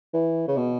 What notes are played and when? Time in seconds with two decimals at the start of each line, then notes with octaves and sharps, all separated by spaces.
0.14 E3
0.48 C#3
0.57 B2